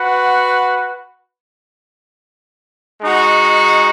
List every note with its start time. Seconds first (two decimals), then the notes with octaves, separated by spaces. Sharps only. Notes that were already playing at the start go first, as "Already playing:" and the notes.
Already playing: F#4 B4 F#5
3.01 G#3 D#4 F#4